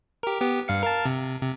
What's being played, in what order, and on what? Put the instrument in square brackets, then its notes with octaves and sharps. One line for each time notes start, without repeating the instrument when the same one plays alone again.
[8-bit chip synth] G4 A#4
B3 G4
G2 F5 C#7
A#4 F5 A5
C3
C3